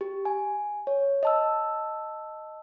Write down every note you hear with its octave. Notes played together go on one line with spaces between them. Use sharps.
G4
G#5
C#5
D#5 A5 E6